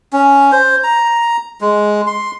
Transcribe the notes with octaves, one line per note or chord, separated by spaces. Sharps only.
C#4
C5
A#5
G#3
C6